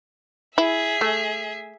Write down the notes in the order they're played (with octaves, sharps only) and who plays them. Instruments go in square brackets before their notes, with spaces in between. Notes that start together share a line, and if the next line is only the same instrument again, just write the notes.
[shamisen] E4 [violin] G#4 E5
[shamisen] A3